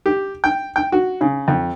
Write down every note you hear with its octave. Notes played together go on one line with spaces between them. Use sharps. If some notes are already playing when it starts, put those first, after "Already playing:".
G4
G5
G5
F#4
C#3
F2